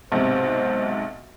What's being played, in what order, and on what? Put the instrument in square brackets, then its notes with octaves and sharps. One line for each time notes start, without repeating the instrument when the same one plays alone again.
[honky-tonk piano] B1 G#2 C3 [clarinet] C5